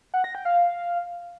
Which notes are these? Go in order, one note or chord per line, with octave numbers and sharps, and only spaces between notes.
F#5
A#6
G5
F5